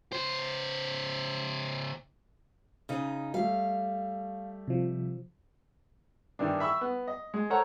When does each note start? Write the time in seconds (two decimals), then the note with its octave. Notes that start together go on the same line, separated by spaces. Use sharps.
0.12 C#3 C5
2.89 C#3 D#4
3.34 G3 A3 F5
4.68 C3 F3
6.39 G2 D#3 E3 D4
6.60 E5 B5 C#6 E6
6.81 B3
7.08 D#5
7.34 G#3
7.50 A4 A#4 C5 C#5 F#5 A#5